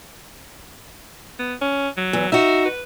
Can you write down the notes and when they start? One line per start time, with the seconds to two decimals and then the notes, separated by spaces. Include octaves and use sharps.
1.39 B3
1.62 C#4
1.97 F#3
2.13 E2
2.32 D#4 F#4 E5
2.65 B4